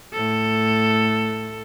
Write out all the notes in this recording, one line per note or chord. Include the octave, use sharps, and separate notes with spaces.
A2 A4